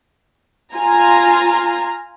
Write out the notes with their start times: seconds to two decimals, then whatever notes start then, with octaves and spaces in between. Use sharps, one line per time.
0.74 F4 G#5 A#5